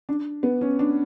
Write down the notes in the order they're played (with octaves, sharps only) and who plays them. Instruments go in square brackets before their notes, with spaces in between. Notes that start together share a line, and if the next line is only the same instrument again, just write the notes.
[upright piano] D4
B3
C#4
D4